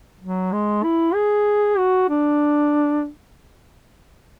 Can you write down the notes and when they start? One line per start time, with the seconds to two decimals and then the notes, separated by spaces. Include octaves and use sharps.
0.21 F#3
0.52 G#3
0.84 E4
1.14 G#4
1.78 F#4
2.09 D4